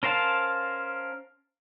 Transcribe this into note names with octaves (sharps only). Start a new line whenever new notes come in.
C#4 A#4 C5 F5 A5